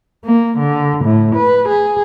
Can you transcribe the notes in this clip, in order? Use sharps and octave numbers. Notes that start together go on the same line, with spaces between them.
A#3
D3
A2
B4
G#4